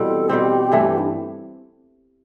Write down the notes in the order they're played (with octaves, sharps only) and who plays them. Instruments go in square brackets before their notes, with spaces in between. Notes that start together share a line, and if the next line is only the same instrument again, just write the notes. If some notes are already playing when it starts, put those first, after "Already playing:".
Already playing: [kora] B2 E3 G3 C4 [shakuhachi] A4
[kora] B2 G3 C4 [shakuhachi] G4
[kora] G2 E3 A3
[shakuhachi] D4